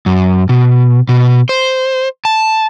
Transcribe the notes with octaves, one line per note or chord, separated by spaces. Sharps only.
F#2
B2
B2
C5
A5